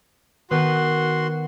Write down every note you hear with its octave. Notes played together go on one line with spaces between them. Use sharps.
D#3 B3 F#4 B4 C6